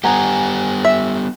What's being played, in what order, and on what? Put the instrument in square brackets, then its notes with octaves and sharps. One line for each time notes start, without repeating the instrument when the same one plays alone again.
[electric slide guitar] G3 B3 G4 [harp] F#5 G#5 A#5
[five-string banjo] E5